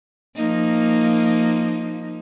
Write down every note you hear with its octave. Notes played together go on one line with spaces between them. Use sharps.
F3 A#3 D#4